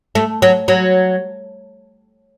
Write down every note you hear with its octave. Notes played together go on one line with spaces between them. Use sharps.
A3
F#3
F#3